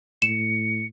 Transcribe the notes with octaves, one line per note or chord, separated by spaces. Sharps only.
A2 C#7 E7